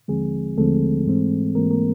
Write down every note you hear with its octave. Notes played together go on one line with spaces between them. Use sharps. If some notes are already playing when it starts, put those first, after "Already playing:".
D#2 D3 F3 G#3 C4 G#4
D#2 D3 F3 G#3 A3 C4 A4
G#2 E3 G#3 C4
G#2 E3 G#3 A#3 C4 A#4
A#3 A#4